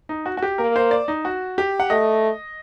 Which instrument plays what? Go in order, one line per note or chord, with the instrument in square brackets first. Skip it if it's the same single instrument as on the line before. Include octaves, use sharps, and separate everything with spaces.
[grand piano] D#4
F#4
F#4
G4
[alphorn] A#3 [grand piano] A#4
[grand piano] C5
D5
D#4
F#4
G4
F#5
[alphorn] A3 [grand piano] D#5